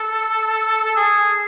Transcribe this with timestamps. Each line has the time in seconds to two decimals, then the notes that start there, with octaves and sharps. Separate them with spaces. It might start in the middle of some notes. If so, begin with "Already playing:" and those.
Already playing: A4
0.84 A4
0.96 G#4